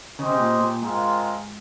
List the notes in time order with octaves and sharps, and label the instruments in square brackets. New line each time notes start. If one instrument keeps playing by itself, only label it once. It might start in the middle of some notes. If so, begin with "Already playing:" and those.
[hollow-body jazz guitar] C#3 [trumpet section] G#3 C#4 G4 C5 D#5
[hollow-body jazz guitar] C3
A#2
A#2
[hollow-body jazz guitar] G#2 [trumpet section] G#3 C4 F4 A#4